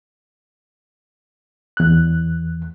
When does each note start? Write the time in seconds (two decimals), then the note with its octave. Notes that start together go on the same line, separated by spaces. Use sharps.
1.77 E2 F#6